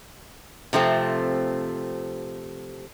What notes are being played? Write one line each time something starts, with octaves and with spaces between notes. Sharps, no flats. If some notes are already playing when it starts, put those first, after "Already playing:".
C3 F3 A3 C4